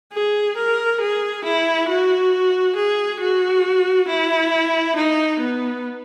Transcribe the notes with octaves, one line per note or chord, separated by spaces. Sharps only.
G#4
A#4
G#4
E4
F#4
G#4
F#4
E4
D#4
B3